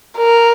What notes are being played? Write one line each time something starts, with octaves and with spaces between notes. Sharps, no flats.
A#4